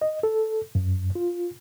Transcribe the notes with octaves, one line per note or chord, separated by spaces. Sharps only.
D#5
A4
F#2
F4